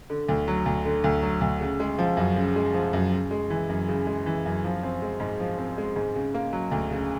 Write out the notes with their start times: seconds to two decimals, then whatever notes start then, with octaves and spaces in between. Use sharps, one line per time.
0.10 D3
0.29 D2
0.48 F#3
0.66 D2
0.85 D3
1.04 D2
1.22 F#3
1.41 D2
1.61 C#3
1.80 G#3
1.99 F3
2.17 F#2
2.36 C#3
2.56 G#3
2.74 F3
2.93 F#2
3.12 C#3
3.31 G#3
3.50 E3
3.69 F#2
3.88 C#3
4.07 G#3
4.26 E3
4.45 F#2
4.64 F3
4.83 C4
5.02 G#3
5.20 G#2
5.40 F3
5.58 C4
5.78 G#3
5.96 G#2
6.15 C#3
6.34 A#3
6.53 F#3
6.71 D2
6.91 C#3